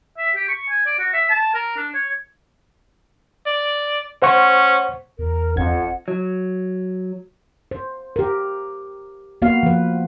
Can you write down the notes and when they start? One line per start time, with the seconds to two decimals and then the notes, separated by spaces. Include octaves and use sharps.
0.18 E5
0.36 G4
0.48 C#6
0.70 G#5
0.86 D5
0.99 F#4
1.13 E5
1.30 A5
1.54 A#4
1.76 D4
1.94 C#5
3.46 D5
4.22 C#4 C5 F#5 C#6
5.19 E2 A#4
5.56 G1 F2 F#5 G#6
6.08 F#3
7.71 C5
8.16 G4 A#4
9.42 A#3 B3 F#4 F5
9.63 F3 B4